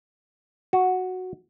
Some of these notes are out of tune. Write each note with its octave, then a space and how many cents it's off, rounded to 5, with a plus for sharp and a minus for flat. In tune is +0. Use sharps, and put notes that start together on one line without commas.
F#4 -5